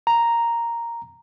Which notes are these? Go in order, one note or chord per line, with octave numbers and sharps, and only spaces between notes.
A#5